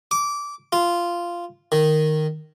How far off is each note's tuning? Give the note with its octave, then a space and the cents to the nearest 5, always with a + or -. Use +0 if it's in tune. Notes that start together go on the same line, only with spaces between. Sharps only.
D6 -15
F4 -10
D#3 -5